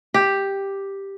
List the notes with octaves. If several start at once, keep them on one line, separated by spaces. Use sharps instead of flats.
G4